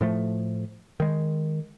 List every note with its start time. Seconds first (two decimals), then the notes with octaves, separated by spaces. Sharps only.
0.01 A2 F3 A3
1.00 D#3 G#3